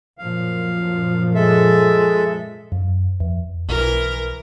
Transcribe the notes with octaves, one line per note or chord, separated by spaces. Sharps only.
F#2 A#2 F3 F5
G#3 A4 E5
F#2
F2
B1 E3 A#4